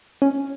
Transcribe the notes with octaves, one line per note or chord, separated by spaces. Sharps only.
C#4